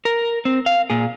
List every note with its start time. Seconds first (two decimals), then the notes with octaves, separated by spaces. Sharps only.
0.05 A#4
0.45 C4
0.66 F5
0.90 A#2 G#4